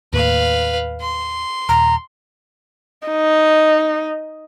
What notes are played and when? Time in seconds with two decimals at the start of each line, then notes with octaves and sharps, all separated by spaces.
0.13 D#2 A2 A#3 B4 F5
1.01 C6
1.69 D#1 A#5
3.07 D#4